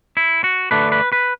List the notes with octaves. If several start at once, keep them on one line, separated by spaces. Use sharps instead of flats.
E4
F#4
D3 A3 D4 B4
B4
B4